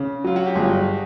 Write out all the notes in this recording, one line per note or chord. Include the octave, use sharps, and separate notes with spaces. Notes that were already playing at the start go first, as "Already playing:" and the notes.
Already playing: C#3
F#3 F4
F#4
G4
G1 G#4